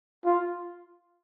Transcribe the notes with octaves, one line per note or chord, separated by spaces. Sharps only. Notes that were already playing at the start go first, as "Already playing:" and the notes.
F4